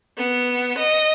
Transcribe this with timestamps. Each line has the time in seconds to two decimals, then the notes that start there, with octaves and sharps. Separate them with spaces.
0.18 B3
0.78 D#5